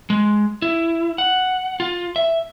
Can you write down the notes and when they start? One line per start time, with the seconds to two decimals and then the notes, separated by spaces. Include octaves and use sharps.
0.10 G#3
0.62 E4
1.18 F#5
1.80 F4
2.16 E5